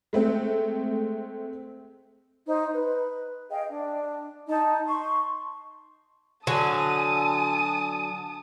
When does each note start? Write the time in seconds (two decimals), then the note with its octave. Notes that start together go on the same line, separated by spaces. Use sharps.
0.13 G#3 A3 C4
2.46 D#4 C5
2.73 B4
3.50 G#4 D#5 F5 G5
3.69 D4
4.48 D#4 A5
4.87 C6 C#6
6.47 D3 F#3 G#5 A5 D#6